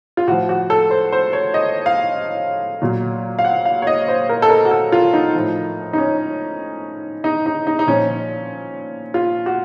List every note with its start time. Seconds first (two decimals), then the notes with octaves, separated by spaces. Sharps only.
0.17 F4
0.27 A2 F3 F#4
0.49 F#4
0.70 A4
0.91 C5
1.12 C5
1.33 C#5
1.54 D#5
1.86 F5
2.82 A#2 F#3
3.39 F5
3.44 F#5
3.65 F5
3.82 C#5
3.87 D#5
4.08 C5
4.29 A#4
4.42 A4
4.50 A#4
4.65 F#4
4.71 A4
4.92 F4
5.13 D#4
5.35 A2 F3
5.93 D#4
5.98 C#4
7.24 D#4
7.46 D#4
7.67 D#4
7.79 D#4
7.87 A#2 F3 C#4
9.14 F4
9.46 F#4